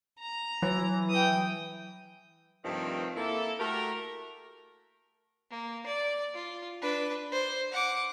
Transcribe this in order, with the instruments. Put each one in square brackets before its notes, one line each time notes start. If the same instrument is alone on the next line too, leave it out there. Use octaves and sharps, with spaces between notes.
[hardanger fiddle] A#5
[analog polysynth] E3 [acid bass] F#3
[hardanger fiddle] G5 D#6
[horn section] G2 C3 D#3 F3 A3 C4
A#3 E4 A4
A3 F#4 G4 A#4
[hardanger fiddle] A#3
D5
F4
D4 B4
C5
F#5 D6